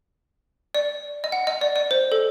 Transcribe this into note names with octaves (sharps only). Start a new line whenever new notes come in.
D5
D#5
F#5
D#5
D5
D5
C5
A4